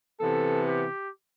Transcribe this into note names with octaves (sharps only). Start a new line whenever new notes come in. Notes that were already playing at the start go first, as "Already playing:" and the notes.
C3 E3 B3 A4
G4